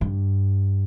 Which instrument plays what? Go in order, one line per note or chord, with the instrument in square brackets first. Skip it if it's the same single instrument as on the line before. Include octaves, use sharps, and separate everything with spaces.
[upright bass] G2